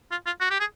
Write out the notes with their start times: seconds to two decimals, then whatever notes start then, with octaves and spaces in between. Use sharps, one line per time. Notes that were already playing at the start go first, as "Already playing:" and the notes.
0.11 F4
0.26 F4
0.40 F#4
0.51 G4
0.60 G#4